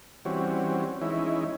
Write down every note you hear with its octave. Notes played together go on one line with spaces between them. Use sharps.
E3 G3 C4 C#4 F#4
E3 G#3 C#4 D#4 E4